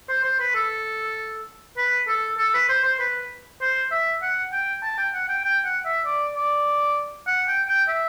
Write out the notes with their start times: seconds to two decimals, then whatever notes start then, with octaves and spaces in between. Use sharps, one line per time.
0.09 C5
0.24 C5
0.40 B4
0.55 A4
1.77 B4
2.08 A4
2.38 A4
2.54 B4
2.69 C5
2.84 C5
2.99 B4
3.61 C5
3.91 E5
4.22 F#5
4.52 G5
4.83 A5
4.98 G5
5.14 F#5
5.29 G5
5.44 G5
5.65 F#5
5.85 E5
6.05 D5
6.36 D5
7.27 F#5
7.48 G5
7.68 G5
7.89 E5